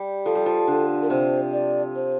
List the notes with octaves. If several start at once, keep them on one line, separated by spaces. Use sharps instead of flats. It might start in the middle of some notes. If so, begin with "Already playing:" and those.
Already playing: G3
F3 A4
G3
F3
D3
A#4
C3 C5
D5
C5